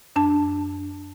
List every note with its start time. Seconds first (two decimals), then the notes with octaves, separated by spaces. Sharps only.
0.16 F#2 D4 A5